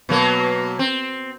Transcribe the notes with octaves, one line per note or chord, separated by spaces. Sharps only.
B2 F#3 A#3
C4